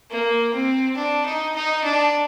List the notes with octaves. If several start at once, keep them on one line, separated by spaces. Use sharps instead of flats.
A#3
C4
D4
D#4
D#4
D4